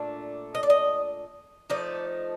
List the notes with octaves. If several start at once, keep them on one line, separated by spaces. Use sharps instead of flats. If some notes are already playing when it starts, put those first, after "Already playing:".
Already playing: A#2 A3 D4
D#5
D5
D#5
F3 A3 D#4 D5